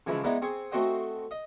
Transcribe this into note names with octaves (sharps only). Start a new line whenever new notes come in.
C#3 E3 F3 G#3 E4
G#3 B3 D#4 E4 B4 D5
C4 G#4 C#6
A3 C4 F#4 C5 D#5 G5
D#5